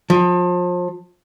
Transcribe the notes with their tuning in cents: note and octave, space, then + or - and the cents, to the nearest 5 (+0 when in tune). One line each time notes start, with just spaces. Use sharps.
F3 +30